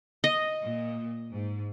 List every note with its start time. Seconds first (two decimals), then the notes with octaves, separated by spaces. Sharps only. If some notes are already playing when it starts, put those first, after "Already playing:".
0.24 D#5
0.63 A#2
1.34 G#2